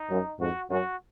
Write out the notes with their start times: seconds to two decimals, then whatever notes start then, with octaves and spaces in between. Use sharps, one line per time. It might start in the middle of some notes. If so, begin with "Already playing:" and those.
Already playing: D#4
0.10 F#2
0.40 F2 G#2 F#4
0.70 F#2 F#4